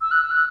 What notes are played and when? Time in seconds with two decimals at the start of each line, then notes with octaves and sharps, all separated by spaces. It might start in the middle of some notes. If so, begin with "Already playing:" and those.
0.01 E6
0.11 F#6
0.21 E6
0.31 F#6